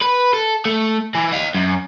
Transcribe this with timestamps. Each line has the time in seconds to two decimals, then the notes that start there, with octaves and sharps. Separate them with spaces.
0.02 B4
0.33 A4
0.65 A3
1.15 E3
1.32 D#5 F5
1.55 F#2